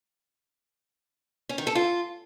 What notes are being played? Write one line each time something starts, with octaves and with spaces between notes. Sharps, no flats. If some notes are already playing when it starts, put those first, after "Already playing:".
C#4
D#3
A4
F4